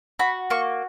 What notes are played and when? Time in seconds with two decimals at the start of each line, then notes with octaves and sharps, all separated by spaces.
0.19 F#4 B5
0.50 A#3 C#6